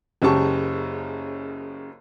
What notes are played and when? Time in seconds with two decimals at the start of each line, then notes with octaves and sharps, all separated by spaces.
0.22 F#1 F#2 C#3 G4 A5 C#6